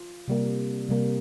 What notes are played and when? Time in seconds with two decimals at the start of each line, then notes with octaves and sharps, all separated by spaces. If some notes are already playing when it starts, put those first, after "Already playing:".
Already playing: F4
0.28 C3 G3 A#3
0.89 C3 G3 A#3